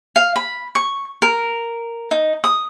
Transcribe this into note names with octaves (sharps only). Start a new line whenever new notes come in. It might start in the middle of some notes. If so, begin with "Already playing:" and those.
F5
B5
C#6
A#4
D#4
D#6